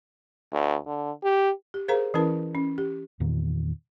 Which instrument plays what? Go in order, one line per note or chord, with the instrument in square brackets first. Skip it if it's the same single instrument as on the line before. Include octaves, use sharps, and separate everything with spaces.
[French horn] D2
D3
G4
[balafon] G4
G#4 A#4 C5 F5 A#5
E3 C#4 E4 A#4 B4 A5
C#4
G4
[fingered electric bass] E2 A#2 D#3